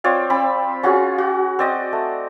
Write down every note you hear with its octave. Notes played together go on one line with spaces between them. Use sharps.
C4 F4 C#5 D5
C4 B5
C#4 F4 F#4 G#4
F#4
C4 D5 D#5
A3